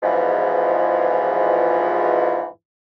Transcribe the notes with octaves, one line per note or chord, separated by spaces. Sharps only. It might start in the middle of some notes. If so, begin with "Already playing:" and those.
E2 G#2 B2 D3 E3 F3